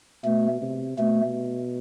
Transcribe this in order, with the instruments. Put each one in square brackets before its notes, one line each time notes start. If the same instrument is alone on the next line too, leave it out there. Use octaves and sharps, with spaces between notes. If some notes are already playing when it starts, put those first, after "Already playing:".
[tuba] B2 [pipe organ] A3
[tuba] C3
[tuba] B2 [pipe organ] A3